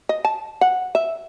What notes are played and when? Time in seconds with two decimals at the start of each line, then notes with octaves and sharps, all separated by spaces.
0.09 D#5
0.25 A5
0.61 F#5
0.95 E5